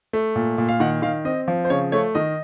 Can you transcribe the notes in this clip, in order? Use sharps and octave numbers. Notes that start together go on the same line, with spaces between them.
A3
A#2
A#2
F5
D#3 F#5
D#3 F5
C4 D#5
F3
C5
C#3 C#5
A3 C#5
D#3 D#5